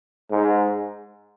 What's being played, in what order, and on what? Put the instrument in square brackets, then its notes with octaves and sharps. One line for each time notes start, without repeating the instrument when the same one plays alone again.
[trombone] G#2